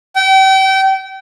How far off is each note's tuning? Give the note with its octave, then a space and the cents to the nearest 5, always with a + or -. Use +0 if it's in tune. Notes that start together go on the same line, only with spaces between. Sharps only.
G5 -35